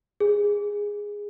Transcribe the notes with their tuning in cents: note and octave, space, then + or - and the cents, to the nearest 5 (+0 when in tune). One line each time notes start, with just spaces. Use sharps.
G#4 -10